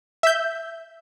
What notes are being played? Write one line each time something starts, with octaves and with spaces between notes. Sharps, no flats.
E5 G6